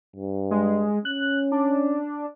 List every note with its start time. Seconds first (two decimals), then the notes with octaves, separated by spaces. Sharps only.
0.16 G2
0.51 G#3
1.05 C#4 F#6
1.52 D4